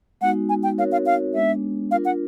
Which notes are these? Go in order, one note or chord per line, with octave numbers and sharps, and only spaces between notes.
G#3 B3 D#4 F#4 F#5
G#5
G5
C4 D#4 F#4 A#4 C#5 F5
F5
F5
G#3 B3 D4 E5
D4 F4 A#4 F5
F#5